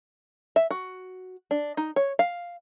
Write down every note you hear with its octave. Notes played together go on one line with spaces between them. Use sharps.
E5
F#4
D4
D#4
C#5
F5